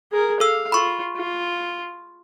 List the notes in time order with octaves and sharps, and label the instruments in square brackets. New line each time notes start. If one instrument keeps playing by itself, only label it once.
[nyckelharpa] G#4 A#4
[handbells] A4 E6 [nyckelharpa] F5
[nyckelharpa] F4 [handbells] B5 C#6
[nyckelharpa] F4